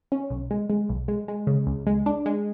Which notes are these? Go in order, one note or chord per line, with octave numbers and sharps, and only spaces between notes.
C#4
B1
G#3
G#3
B1
G#3
G#3
C#3
C#2
G#3
D4
G#3